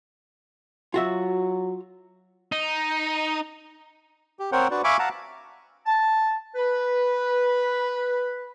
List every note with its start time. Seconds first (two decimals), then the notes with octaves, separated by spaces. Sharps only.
0.94 F#3 F4 F#4 E5
2.52 D#4
4.39 G4
4.52 C4 A#4 C5 C#5 F#5 G5
4.71 D4 F#4 B4 D5
4.84 E5 F5 G#5 B5 C#6 D6
4.99 F5 F#5 A5 A#5
5.86 A5
6.55 B4